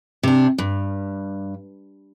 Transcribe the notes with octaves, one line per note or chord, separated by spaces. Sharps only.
C3 D4
G2